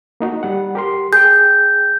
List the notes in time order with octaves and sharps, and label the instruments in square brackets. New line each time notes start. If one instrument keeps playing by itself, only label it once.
[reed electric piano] A#3 D#4 F#4
G3 F#5
G4 A#4 C6
[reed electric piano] G#4 G5 [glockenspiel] G6